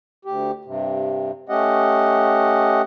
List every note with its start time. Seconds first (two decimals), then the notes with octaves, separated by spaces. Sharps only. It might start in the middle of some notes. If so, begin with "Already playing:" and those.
0.25 D2 G4
0.65 G2 C3
1.49 A3 C#4 G4 D#5 F#5